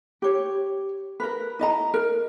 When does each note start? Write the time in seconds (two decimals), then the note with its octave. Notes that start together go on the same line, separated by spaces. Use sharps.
0.22 G4 C#5
1.20 A#4 B4
1.59 E4 D#5 A#5
1.94 A#4